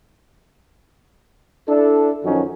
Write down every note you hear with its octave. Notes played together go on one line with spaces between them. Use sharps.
D4 E4 A4
F#2 D#3 F3 C#4 D#4 F#4